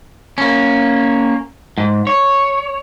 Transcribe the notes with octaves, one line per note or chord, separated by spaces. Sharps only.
A#3 C#4
G#2
C#5